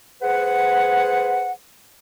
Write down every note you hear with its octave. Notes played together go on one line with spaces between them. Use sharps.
G#4 B4 C5 F#5